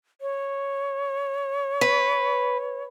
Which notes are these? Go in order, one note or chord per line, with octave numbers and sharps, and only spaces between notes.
C#5
B4